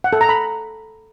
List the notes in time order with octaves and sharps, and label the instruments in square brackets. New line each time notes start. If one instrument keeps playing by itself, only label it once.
[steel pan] F#5
A4
A#5
B5